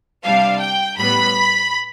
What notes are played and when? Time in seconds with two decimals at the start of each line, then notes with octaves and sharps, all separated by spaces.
0.24 C3 G3 D4 F5
0.60 G5
0.98 A2 G3 B3 B5